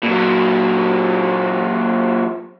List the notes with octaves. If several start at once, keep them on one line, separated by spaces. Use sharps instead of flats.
A#2 F#3